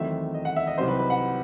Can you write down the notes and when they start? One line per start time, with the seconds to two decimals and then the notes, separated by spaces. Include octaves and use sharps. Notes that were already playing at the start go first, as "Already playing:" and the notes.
Already playing: E2 D#3 F#3 A3 C4 E5
0.34 D#5
0.45 F#5
0.56 E5
0.67 D#5
0.78 C2 C3 F#3 C4 D#4 C5
0.88 B4
0.99 B4
1.10 F#5